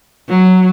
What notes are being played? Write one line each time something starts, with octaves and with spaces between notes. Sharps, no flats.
F#3